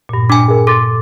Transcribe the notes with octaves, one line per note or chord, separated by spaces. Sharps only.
G2 A#2
D4 G#5 D6
G#4 A#4
A4 C6 D6 A6